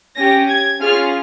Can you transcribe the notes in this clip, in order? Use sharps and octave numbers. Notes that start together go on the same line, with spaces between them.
C#4 G4 A#6
G#6
C#4 F4 G#4 F6